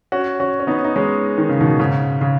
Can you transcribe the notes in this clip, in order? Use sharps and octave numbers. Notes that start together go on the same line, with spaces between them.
C#4 F#4
C#4 F#4
C#4
B3 D#4
D#4
G#3 C#4
D#3
C#3
B2 D#3
G#2 C#3
C#3